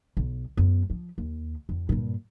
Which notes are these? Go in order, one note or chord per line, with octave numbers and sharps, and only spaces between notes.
B1
F#2 B3
F3
D#2
F2
G2 A#2